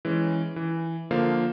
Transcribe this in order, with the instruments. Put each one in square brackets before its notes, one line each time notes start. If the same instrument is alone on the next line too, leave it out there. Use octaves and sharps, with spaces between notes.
[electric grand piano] E3 G#3 C#4
E3
D3 F3 A#3 F5